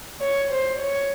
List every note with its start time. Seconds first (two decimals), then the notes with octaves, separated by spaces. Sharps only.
0.21 C#5
0.50 C5
0.79 C#5